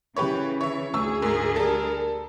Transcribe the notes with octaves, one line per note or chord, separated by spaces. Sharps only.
C#3 E3 G4 B4 C#5
C#5 E5
D2 G#4 C#6 E6
G#2 A#4
G3 A4 A#4